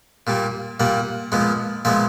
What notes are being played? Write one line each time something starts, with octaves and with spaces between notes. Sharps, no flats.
A#2 G3 A#3
A#2 G3 A#3 F#5
A#2 F3 G#3 B3
A#2 F3 G#3 B3 E5